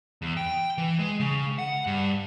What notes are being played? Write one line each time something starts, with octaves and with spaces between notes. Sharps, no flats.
E2
G5
E3
G#3
C#3
F#5
G2